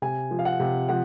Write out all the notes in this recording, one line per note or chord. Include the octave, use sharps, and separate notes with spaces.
C3 G#5
F3
F5
F#5
C3
F3 F#5